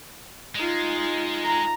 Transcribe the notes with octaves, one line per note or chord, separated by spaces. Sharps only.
G#3 D#4 F4
A#5